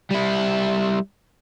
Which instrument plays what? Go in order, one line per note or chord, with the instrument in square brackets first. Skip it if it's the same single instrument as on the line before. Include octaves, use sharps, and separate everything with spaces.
[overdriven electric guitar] G3 E4